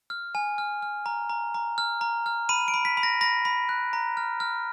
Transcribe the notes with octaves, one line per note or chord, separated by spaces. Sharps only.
F6
G#5
F6
F6
A#5
A#5
A#5
F6
A#5
F6
B5 D#7
D7
B5
B6
B5
A#6
B5 A#6
B5
F#6
A#5
F6
F6